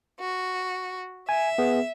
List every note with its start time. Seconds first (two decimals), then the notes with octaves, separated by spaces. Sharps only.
0.20 F#4
1.29 E5 G#5
1.58 B3 G#4